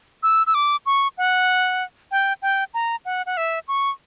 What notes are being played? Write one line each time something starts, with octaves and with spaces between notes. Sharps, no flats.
E6
E6
D6
C#6
F#5
G5
G5
A#5
F#5
F#5
E5
C#6